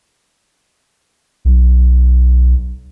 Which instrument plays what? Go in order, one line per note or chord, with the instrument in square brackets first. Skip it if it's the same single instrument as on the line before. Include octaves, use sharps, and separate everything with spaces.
[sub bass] B1